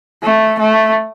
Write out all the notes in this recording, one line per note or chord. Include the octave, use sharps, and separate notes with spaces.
A3
A3